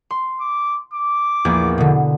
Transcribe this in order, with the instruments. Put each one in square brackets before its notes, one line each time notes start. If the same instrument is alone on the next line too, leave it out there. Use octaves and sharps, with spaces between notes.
[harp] C6
[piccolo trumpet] D6
D6
[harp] A#1 E2 A#3
B2 D3